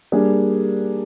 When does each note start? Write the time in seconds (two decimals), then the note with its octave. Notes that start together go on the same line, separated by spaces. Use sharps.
0.12 G3 A#3 D4 G#4